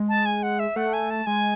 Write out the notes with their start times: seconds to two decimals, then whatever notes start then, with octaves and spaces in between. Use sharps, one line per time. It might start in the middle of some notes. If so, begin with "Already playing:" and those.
Already playing: G#3
0.09 A5
0.26 G#5
0.43 F#5
0.59 E5
0.76 A3 F#5
0.93 G#5
1.10 A5
1.26 G#3 G#5